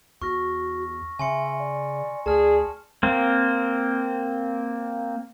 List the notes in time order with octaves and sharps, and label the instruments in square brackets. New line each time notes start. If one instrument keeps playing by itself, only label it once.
[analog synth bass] E2 [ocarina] F#4 [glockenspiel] C#6 F6 A#6
[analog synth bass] C#3 [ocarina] E5 [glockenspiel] G#5 C6 C#7
[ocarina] D5
[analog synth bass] D2 [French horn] G#4 [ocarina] D5 [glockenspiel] A5 F6
[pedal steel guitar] A#3 C4